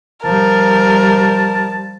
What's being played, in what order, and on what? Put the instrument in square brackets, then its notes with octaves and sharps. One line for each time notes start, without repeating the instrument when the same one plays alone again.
[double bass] F3 G3 [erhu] A#4 [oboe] A5